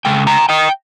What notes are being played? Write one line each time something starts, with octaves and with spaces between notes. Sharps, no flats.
C#3 G#3 G5
G5 A#5
D#5 G5